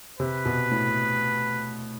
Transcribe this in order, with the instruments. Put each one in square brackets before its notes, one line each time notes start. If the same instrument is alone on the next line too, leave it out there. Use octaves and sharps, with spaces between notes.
[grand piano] C3 [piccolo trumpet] B4
[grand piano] B2
A2